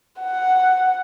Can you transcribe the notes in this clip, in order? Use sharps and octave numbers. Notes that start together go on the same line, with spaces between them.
F#5